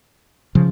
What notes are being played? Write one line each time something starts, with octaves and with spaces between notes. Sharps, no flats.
C#3 F3